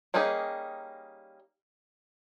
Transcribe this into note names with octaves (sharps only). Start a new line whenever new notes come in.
G3 A#3 C#4 D#4 G#4